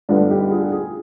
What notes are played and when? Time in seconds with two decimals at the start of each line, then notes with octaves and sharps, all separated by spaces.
0.09 G2 D3 G3 B3 D4 F4
0.30 D#4 G4
0.51 F4 G#4
0.72 F4 G#4